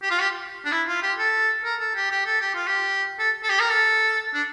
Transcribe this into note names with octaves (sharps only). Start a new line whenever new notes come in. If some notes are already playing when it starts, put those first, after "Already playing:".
G4
F4
G4
D4
E4
F4
G4
A4
A#4
A4
G4
G4
A4
G4
F4
G4
A4
A4
G4
A#4
A4
D4